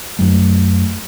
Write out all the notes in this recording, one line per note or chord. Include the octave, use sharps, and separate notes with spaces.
F#2 F#3 A3